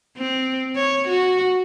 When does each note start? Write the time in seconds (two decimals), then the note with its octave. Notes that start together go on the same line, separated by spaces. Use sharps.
0.18 C4
0.76 C#5
1.08 F#4